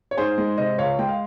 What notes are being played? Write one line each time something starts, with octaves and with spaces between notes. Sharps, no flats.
C#5
G#2 G#4 C5
G#3
C3 C5 D#5
C#2 C#5 F5
G#3 G5
F5